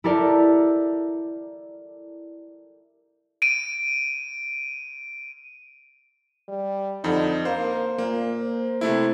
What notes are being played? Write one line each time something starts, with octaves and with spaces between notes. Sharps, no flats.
E4 G4 A4 A#4 D5
D7 D#7
G3
F2 D3 D#4
A#3 C5
A#2 A#3
C5
C3 A3 E4